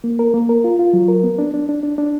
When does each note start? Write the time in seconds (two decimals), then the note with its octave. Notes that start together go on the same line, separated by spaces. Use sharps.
0.04 A#3
0.19 A#4
0.34 A#3
0.49 A#4
0.64 F4
0.79 F4
0.93 F#3
1.08 A#4
1.24 B3
1.38 D4
1.54 D4
1.69 D4
1.83 D4
1.98 D4